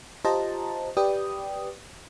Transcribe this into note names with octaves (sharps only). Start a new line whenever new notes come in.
F4 G4 C5 D#5 A5 A#5
G4 B4 D5 G5 D#6